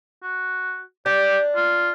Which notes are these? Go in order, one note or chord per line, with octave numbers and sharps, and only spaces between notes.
F#4
D4 G4
F4